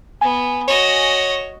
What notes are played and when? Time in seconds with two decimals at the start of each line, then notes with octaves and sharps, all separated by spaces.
0.21 B3 G#5
0.68 F#4 C#5 D#5